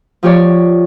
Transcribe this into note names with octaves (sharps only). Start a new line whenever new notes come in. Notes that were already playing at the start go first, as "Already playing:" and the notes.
F3 F4 G4 C#5 D5